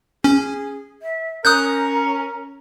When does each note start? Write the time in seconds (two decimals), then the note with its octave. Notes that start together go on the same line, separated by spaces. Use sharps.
0.24 C#4 G#4
1.02 E5
1.45 C#4 A#4 A#5 D#6 F#6 G6